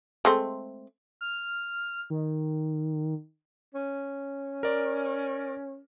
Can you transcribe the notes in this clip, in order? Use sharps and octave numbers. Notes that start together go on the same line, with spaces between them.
G#3 A3 C4
F6
D#3
C#4
A#4 D5